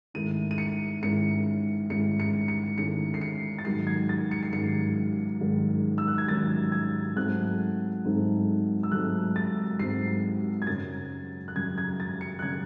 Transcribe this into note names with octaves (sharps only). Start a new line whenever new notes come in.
G#2 D#3 A3 C#4 E4 D#7
D#7
C#7
G#2 D#3 A3 C#4 E4 C#7
G#2 D#3 A3 C#4 E4 C#7
C#7
C#7
G#2 D#3 A3 C#4 E4 C#7
C7
C#7
A6
G#2 D#3 F#3 C#4 C7
G#6
A6
C#7
C7
G#2 D#3 F#3 C#4 C#7
G#2 D#3 F#3 C#4
E6
F#6
G#6
G#2 D#3 F#3 C#4 A6
G#6
G#2 F#3 A3 C4 D#4 F#6
G#2 F#3 A3 C4 D#4
E6
G#2 F#3 A3 C4 D#4 F#6
A6
G#2 F#3 A3 C4 D#4 C7
G#6
F#2 C#3 F#3 C#4 A6
F#6
F#2 C#3 F#3 C#4 G#6
G#6
A6
C#7
F#6
C#3 F#3 C#4 G#6